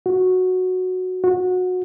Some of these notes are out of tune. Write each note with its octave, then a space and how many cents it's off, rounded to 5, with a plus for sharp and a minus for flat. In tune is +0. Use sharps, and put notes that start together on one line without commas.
F#4 -5
F#4 -20